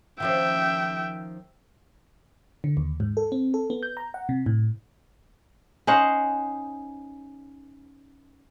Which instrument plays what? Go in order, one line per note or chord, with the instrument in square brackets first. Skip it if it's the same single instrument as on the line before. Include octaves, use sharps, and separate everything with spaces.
[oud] D#3 F3 C#4 [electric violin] E5 G5
[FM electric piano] D3
D#2
G#2
A4
C4
A4
B3
G6
A#5
F#5
C3
A2
[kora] C#4 D#4 C5 F#5